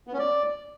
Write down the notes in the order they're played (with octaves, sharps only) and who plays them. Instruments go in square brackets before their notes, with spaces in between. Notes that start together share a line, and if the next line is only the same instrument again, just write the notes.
[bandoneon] B3
C#4
D5